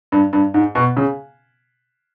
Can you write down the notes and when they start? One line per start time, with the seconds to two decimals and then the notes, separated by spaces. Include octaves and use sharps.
0.12 G2
0.33 G2
0.54 G#2
0.75 B2
0.97 C#3